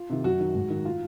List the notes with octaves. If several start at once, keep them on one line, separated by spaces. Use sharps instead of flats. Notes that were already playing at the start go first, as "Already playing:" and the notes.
Already playing: F4
C3 D#3
F#2 F#4
D#3
G#2
D#3
F4